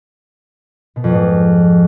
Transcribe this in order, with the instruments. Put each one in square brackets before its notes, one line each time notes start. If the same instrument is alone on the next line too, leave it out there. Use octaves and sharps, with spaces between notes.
[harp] B2
F2
G#2